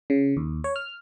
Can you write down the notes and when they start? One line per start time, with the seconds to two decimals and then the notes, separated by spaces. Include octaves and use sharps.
0.10 C#3
0.37 D#2
0.64 C#5
0.76 F6